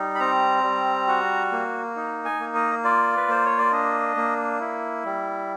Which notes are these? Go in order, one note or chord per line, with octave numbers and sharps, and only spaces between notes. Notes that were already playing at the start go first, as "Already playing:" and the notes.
Already playing: G3 D#4
B5
C4 A#5
G3
F#4
A#3
D#4
G#5
A#3
D#5
F4 D5
B4
A#3 C5
C#5
D5
D4 D#5
A#3
E4
G3